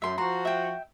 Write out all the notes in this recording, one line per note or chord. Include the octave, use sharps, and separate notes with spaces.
F#2 E5 C6
F3 F#4 A#5 C6
E5 G5